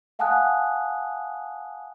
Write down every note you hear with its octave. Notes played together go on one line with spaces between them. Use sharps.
F5 F#5 G#5 A5 D#6 F#6